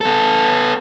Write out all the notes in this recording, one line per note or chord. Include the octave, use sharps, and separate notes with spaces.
B3 A4